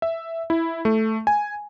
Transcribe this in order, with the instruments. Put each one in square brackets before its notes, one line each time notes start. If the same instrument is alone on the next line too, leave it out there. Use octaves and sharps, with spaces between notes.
[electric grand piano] E5
E4
A3
G#5